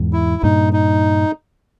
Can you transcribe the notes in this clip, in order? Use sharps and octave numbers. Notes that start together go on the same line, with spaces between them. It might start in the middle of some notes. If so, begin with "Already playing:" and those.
Already playing: E2 G#2
E4
G2 A#2 D#4
D#4